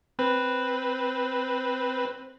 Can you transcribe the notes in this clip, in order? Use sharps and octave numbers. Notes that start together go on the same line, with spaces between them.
C4 B4